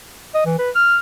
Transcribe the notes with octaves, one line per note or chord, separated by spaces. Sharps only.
D#5
E3
B4
F6